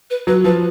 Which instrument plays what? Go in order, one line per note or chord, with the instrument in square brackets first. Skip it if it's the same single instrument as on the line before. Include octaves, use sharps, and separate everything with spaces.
[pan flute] B4
[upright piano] F#3 [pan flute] B4
[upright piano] F3 [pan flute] B4